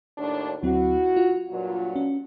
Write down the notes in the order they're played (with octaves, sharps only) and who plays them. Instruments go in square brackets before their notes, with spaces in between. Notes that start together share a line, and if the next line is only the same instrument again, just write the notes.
[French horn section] D#2 A2 D4
[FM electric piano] D2 F#3 C4 [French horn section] E4 F#4
[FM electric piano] F4
[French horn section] G2 A#2 F#3
[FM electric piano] C#4